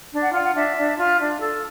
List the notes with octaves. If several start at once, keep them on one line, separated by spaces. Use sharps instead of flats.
D4
F#5
F4 F#5
F#5
D4 E5
D4
F4
D4
A4